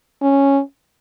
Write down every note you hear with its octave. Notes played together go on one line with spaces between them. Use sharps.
C#4